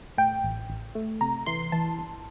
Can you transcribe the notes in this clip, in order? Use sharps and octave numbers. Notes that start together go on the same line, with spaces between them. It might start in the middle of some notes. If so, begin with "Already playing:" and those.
A2 G5
A1
A1
A3
C3 A#5
E3 C6
E3 A5
G1